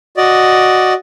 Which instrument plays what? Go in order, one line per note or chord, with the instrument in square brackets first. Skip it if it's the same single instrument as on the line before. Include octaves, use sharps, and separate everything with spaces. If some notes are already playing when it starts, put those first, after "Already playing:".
[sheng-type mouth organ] F#4 D5 D#5